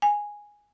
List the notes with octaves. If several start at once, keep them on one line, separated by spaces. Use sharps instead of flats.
G#5